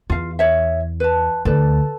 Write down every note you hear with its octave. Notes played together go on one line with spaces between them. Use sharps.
E2 F4 F5
C#5 E5
B4 A5
D2 A4 B4 D5